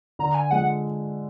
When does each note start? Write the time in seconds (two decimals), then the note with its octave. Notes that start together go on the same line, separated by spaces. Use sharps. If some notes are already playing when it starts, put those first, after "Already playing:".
0.19 D3 A#5
0.35 G#5
0.51 F3 G#3 F#5